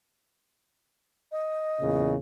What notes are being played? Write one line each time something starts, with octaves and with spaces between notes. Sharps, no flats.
D#5
E2 A#2 C#3